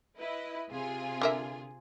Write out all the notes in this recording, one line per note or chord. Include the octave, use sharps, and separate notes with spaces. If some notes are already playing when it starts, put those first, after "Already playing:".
E4 B4 D#5
C3 F4 G#4
D3 A#4 E5